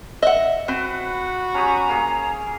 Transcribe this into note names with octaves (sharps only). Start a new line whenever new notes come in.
D#5 E5 F#5
C4 F#4 B4
C#4 G4 A#5 D#6
A#3 G#4